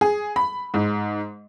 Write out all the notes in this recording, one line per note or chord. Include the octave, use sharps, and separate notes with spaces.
G#4
B5
G#2